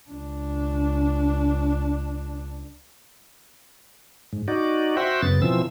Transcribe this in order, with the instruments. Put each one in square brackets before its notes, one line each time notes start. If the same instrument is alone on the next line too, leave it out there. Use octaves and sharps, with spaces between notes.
[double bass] C#2 D4
[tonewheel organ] G#2
D#4 F#4 D5
F#4 C5 E5 F#5 G5
F#2 C#3 B3 A6
B2 E3 F3 C4 E6